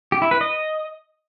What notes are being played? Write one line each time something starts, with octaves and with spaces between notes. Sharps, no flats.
G4
E4
B4
D#5